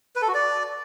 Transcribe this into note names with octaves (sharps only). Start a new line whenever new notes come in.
B4
A4
F#4
D5